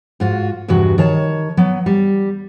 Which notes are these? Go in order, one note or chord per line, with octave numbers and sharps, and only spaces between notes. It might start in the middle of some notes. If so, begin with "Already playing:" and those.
G#2 F4 F#4
E2 G2 C3 F#4
D#3 C#5 A5
F#3 B3
G3